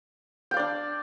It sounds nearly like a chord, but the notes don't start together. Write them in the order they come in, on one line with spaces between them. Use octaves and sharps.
G5 F5 D5 D4